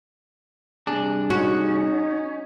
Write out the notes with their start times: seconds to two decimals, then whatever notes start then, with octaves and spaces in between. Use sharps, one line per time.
0.87 G2 C3 D4 G#4
1.30 C#4 D#4 F#4